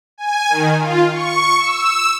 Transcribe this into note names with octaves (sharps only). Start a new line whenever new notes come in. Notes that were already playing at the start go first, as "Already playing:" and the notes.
G#5
D#3
F4
C#6
E6